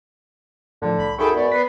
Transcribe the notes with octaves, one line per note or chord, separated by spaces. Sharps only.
A2 D3 F3
C2 B5
F#2 D#4 G#4 A4 G5 G#5 B5 C#6
G#2 B3 D5
B3 B4 B6 C7